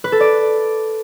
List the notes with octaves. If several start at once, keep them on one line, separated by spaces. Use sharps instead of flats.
B4
A4
D5